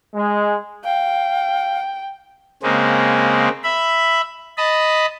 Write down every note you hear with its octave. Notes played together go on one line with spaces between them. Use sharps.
G#3
F5 G5
C#3 G#3 A#3 C4
E5 B5
D#5 A5 B5